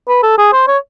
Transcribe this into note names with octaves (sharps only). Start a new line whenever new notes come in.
B4
A4
G#4
C5
C#5